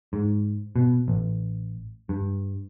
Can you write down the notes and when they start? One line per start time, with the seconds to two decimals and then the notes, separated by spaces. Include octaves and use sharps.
0.13 G#2
0.76 B2
1.08 A1
2.09 G2